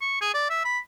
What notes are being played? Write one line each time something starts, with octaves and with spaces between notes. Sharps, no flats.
C#6
G#4
D5
E5
B5